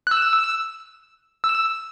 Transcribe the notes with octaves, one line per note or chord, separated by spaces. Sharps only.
F#6
E6
E6